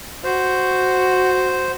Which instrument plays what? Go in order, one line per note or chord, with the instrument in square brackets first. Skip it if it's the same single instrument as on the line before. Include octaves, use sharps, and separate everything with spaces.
[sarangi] F#4 [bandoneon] C5